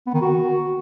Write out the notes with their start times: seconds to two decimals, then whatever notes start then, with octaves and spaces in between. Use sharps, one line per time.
0.06 B3
0.14 D#3
0.22 F#4